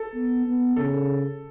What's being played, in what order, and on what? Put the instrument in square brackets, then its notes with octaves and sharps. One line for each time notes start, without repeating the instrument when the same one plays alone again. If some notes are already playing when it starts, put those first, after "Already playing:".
Already playing: [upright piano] A4
[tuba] B3
B3
[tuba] C#3 [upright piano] A4